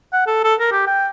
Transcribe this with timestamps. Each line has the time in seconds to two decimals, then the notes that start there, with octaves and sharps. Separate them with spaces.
0.13 F#5
0.27 A4
0.44 A4
0.60 A#4
0.72 G4
0.87 G5